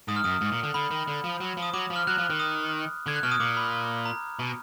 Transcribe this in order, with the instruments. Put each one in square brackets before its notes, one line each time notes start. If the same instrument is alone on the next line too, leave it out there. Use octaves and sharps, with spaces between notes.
[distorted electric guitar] G#2 [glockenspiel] D#6
[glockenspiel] F6
[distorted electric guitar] F#2 [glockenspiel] D#6
[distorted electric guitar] G#2
A#2
D3
[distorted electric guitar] D3 [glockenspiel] B5
[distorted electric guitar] D#3
D3
F3
F#3
F3
[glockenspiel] D#6
[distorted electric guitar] F#3 [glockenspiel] D6
[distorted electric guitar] F3
[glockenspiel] F6
[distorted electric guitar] F#3 [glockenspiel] F#6
[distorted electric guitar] F3
D#3
[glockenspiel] D#6
[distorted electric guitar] D3 [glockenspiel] G#6
[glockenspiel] F#6
[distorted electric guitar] B2 [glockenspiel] F6
[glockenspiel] D#6
[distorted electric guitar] A#2 [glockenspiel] D6
[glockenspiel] B5
A#5
[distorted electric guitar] B2